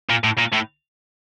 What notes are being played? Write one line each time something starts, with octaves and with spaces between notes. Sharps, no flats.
A#2
A2
A#2
A2